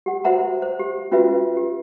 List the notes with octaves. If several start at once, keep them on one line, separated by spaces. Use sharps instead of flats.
G4 F#5
F#4 C5 E5 F#5 A#5
C5
G4
C#4 F4 F#4 B4 E5
G4